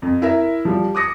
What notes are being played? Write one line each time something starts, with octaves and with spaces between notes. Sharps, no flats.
F2
E4 A#4 E5
F3 G3
D6 D#6 A#6 C#7